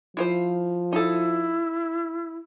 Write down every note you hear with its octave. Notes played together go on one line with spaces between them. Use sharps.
F3 E4 F4 C5
D#4 E4 A4